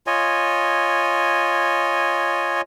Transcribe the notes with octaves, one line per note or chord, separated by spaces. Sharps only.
F4 C#5 D#5 G#5